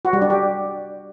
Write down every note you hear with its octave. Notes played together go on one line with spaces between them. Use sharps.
F#4
G3
D4
G4